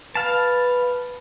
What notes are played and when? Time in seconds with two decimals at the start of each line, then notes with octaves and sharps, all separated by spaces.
0.15 B4 F5 A5